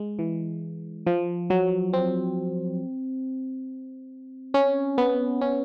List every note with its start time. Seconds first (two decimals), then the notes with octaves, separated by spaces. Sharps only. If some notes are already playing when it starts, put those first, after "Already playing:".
Already playing: G#3
0.19 E3
1.07 F3
1.50 F#3
1.93 C4
4.54 C#4
4.98 B3
5.41 C#4